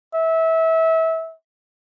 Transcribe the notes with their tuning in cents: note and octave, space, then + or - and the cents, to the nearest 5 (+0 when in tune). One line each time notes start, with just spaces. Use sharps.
E5 -25